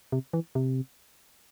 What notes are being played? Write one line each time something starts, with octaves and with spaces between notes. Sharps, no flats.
C3
E3
C3